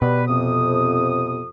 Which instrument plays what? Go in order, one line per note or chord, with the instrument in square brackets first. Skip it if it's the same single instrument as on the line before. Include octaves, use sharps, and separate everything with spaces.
[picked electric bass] B2 [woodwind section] G3 B4
[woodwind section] F2 C3 D#6